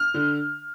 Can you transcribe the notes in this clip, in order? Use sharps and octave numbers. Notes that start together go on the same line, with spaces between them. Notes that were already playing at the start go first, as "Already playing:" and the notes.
Already playing: F6
D3